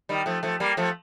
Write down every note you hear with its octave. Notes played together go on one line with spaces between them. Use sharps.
D#3 G3
F3 A3
F3 A3
G3 A#3
F3 A3